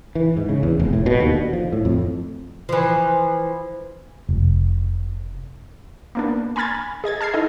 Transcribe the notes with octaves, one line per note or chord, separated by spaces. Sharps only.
E3
G#2
C#3
E2
F1
A2
B2
D#2
D3
F3
A2
F2
E3 F3
F1
A#3 B3 D4
G#5 A#5 B5 F6 G#6 A6
G#4 D#5 G#6 A6
A5 F6 G#6 C7
D#4 E4 A4 D#5 A#5